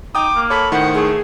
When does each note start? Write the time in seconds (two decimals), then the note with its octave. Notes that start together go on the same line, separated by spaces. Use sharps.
0.15 D#4 G5 D6 D#6
0.35 A#3
0.50 A4 C#5 B5
0.72 A2 D#3 C5 F#5 C6
0.94 A3 G#4